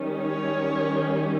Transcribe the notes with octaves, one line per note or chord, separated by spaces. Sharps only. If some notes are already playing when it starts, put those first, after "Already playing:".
Already playing: D#3 G3 C#4
C#5